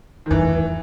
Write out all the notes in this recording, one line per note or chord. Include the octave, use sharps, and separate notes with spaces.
D#3
F#2 E3
G#2
F#2